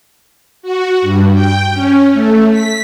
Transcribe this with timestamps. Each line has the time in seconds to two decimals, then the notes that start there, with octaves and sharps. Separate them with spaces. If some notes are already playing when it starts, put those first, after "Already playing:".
0.62 F#4
1.02 G2
1.33 G5
1.73 C#4
2.13 A3
2.51 B6